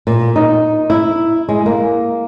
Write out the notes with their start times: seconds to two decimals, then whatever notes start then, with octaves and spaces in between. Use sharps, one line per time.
0.07 A#2
0.36 D#4
0.90 E4
1.49 G#3
1.66 A#3